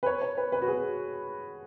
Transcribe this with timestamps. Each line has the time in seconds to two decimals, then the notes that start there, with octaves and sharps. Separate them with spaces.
0.03 B4
0.06 C#5
0.22 C#5
0.37 B4
0.52 B4
0.61 F#4
0.68 G#4